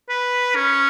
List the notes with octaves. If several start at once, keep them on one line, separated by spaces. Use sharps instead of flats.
B4
C#4